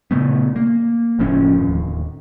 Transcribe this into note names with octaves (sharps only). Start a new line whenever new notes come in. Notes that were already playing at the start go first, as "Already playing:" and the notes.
A#2 C#3 A3 B3
A#3
F#1 A2 F3 C#4
D1 D#2